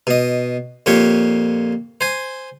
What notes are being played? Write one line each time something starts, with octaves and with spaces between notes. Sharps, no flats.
B2 D#5
F2 A#2 G4 C#5
C5 G#5